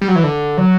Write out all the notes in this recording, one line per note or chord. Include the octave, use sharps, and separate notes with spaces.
G3
F#3
E3
D3
F#3